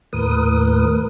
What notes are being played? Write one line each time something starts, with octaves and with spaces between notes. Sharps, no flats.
D#2 A2 A#4 B4 D#6